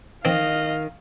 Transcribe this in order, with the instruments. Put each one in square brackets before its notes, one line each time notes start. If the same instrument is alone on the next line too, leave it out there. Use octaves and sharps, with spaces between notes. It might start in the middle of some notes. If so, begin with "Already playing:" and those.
[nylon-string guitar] D#3 [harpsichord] C4 [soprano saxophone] D#5 [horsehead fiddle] F5